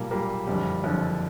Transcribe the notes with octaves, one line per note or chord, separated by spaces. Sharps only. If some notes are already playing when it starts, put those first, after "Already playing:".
Already playing: B1 A#2 G3 A#3
B1 A#2 G3 A#3
F#1 F2 D3 G3
F#1 F2 D3 G3